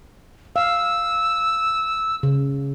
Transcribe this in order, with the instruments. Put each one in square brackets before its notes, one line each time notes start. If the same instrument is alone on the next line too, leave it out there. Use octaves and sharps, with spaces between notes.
[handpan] F5 [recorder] E6
[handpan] C#3